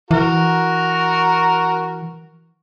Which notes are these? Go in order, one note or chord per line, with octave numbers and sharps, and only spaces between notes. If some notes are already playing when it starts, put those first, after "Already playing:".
E3 F#4 A#4 A#5